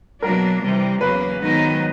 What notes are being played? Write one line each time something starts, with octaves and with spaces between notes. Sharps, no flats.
B2 F#3 A#3 D4 A#4
C3 E3 G3
E2 C#3 F#3 A#3 B4
G#2 D#3 F#3 B3 D#4